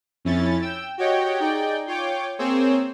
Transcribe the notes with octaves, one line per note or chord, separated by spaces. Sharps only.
F2 C#4 E4 A6
G5 E6
F#4 G4 C#5 D#5 G5
D#4 G#4 D5 G5
F4 C#5 G5 D6
A#3 C4 G#4 C5 C#5 E6